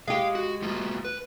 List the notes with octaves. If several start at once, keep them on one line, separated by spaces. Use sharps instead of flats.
G#3 G4 F5
F#4
A3 F4 F#4
B4